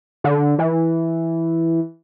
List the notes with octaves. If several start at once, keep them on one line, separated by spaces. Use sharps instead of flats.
D3
E3